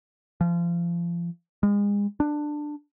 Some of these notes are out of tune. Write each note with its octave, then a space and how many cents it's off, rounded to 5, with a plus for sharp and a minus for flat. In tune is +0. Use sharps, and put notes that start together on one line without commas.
F3 -30
G#3 -35
D4 +15